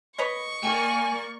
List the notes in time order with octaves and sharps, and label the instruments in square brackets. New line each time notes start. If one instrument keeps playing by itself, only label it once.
[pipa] B4 C#5 D#5 [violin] C#6
[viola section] A#3 D5 [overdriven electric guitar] G5 G#5